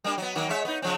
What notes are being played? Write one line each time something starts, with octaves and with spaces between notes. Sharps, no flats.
G3 A#3 D4
F#3 B3
D#3 F#3 A#3
G#3 C#5 E5
B3 D#4
C#3 F3 C4